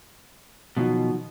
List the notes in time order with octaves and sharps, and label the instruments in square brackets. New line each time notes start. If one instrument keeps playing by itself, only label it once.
[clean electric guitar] B2 [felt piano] D#3 F3 F#3